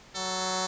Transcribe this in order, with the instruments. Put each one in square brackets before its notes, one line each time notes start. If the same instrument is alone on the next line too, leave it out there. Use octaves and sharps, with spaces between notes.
[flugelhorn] F#3 [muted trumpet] A4